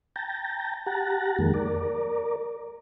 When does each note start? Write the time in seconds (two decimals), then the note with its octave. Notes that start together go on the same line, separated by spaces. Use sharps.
0.16 G5 A5 A#5
0.86 G4 F#5 A5 A#5
1.39 F2 D#3 G#3 A#3
1.54 A#4 D5